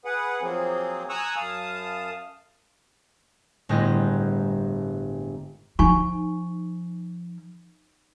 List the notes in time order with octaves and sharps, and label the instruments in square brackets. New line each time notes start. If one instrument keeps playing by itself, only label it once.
[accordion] G#4 B4 F#5
F3 F#3 A#3 C4 G#4
G#5 A#5 C#6 D#6 E6 F#6
F#2 F5 A5 D#6
[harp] G1 A2 G#3 B3 C4 D#5
[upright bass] F3 [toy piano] D#4 G#5 C#6